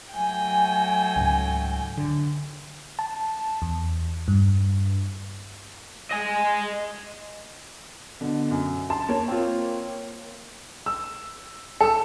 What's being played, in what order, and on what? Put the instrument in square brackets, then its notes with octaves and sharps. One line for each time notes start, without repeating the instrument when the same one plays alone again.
[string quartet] F#3 A3 G5 [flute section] G#5
[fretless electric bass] C#2 G#2
D3
[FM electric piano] A5
E2
G2
[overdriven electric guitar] D#5 G#5
[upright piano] B2 D3
F#2
[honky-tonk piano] A5 [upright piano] C6
[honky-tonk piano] A#3 C#5
[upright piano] C4 F4
[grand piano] E6
A4 E6